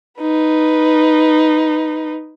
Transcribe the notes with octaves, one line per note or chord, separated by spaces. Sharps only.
D#4 B4